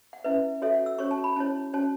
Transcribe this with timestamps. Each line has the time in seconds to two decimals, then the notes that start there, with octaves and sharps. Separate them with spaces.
0.13 F#5
0.24 C#4 E4 B4 E5
0.62 F#4 A4 C#5 E5
0.75 F#5
0.86 E6
0.98 C#4 F#4 C#5 C#6
1.11 A5
1.24 B5
1.36 C#4 E4 C#5 A5
1.74 C#4 F#4 C#5 A5